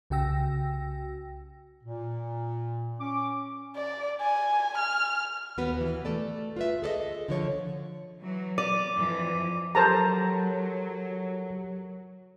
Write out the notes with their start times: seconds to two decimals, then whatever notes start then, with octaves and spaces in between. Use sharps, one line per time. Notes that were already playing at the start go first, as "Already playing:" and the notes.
0.10 C2 C#3 F#4 G5 E6 A#6
1.84 A#2
3.00 C#4 D6
3.75 D5
4.21 G#5
4.77 F6
5.58 D#2 B3 F#4 B4
5.81 E3
6.05 A3 A4 D5
6.56 F4 B4 E5
6.82 G#4 A4 D5 D#5
7.28 D3 F3 C#5
8.20 E3 F#3
8.58 D5 D6 D#7
8.94 F2 E3 F3
9.75 F#3 G4 A4 A#4 C5 A5 A#5